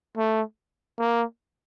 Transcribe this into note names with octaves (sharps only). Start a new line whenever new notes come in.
A3
A#3